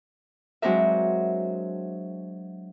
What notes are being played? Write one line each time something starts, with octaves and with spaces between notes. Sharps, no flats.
F#3 G#3 C4 D4 A#4 E5